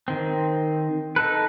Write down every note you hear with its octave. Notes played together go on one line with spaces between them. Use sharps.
D#3 C4
D#4 A4 B4